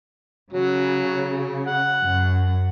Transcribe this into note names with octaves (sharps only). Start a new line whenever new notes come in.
C#3 F#3
F#5
F#2